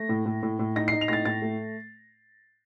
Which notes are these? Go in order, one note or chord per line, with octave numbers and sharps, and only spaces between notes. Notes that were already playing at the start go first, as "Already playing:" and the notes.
Already playing: A3 A#6
A2
A2
A2
A2
D#4 A#6
D#4 C7
F7
A2 A6 A#6
A2 A6
A3